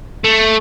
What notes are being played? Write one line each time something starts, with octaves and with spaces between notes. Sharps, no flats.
A3